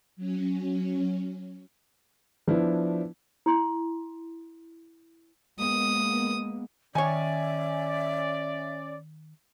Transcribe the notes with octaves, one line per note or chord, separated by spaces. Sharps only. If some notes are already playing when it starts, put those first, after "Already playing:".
F#3 C#4
F3 B3 D4 E4
E4 C6
G#3 A#3 B3 D#6
D#3 C#4 C#5 D5 E5 G#5